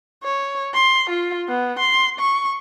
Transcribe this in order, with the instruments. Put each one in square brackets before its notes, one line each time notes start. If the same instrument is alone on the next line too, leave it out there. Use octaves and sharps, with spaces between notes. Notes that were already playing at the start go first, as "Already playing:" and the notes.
[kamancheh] C#5
C6
F4
B3
C6
C#6